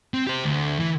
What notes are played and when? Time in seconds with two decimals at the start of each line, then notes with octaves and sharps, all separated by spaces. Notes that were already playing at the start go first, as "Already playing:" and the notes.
0.14 C4
0.27 G4 C5
0.44 D2
0.79 E3